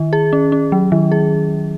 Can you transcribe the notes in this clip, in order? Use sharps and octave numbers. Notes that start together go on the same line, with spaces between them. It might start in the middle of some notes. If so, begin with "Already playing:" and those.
Already playing: D#3
G#4
C#4
C#4
F#3
D#3
G#4